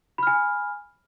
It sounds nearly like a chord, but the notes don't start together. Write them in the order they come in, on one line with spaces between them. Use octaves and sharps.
B5 F6 G#5